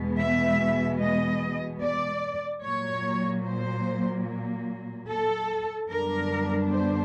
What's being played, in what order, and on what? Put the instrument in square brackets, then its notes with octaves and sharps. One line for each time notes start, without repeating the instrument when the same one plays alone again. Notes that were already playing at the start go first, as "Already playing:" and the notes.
Already playing: [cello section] E2 B2 G#3 B3
E5
D#5
D5
A#2 F#3 A#3 C#5
C5
A4
F#2 D3 G3 B3 D4 A#4
C5